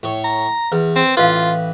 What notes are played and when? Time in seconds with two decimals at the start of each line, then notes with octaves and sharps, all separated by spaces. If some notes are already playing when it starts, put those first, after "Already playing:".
0.03 A2 C#5
0.24 A#5
0.72 E2 B4
0.96 C4
1.17 A1 F4 B4 F5 D#6